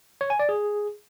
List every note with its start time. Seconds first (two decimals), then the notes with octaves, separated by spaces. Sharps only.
0.21 C#5
0.30 G#5
0.39 D5
0.49 G#4